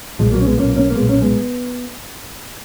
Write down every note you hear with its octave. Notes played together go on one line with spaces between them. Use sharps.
B1 A#2 F3 G#3
F#3 A#3
C#4
G#3 B3
B1 A#2 A#3 C#4
A#3 C#4
A#3
B1 A#2 G#3 B3
A#3 C#4
G#3 B3